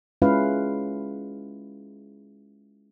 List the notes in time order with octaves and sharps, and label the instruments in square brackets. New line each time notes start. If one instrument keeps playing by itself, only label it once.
[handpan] G#3 C#4 E4 F4 B4 F5